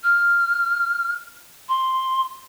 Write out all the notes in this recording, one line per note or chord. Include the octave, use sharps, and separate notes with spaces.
F6
C6